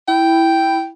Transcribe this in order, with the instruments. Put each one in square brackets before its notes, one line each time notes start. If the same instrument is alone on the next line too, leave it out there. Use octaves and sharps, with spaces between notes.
[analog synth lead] E4 [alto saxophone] G5